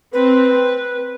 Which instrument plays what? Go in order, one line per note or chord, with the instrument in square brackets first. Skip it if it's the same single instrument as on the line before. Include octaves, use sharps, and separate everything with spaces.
[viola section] C4 [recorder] B4